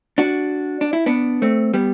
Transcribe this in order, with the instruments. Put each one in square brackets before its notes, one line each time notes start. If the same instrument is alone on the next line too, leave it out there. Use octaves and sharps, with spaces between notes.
[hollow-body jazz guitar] D4 F#4
D4
E4
B3 D4
A3 C4
G3 B3